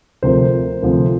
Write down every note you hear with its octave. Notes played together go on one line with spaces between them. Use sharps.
D2 C3 F3 A#4 C5
D2 C3 F3